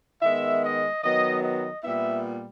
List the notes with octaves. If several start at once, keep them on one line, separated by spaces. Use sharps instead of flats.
D#3 G#3 B3 E5
D#5
D#3 F#3 B3 D#5
D#5
A#2 G3 B3 E5